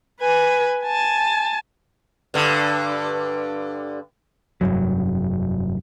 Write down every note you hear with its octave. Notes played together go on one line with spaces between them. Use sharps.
B4 G#5
G#5 A5
G2 D3
F1 B1 G2 F#3